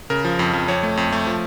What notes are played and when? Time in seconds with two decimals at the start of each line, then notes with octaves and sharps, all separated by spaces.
0.10 C#3 A#4
0.25 F3
0.39 F2
0.53 F2
0.68 F2 C#5
0.83 A3
0.97 F2
1.12 A3
1.27 F3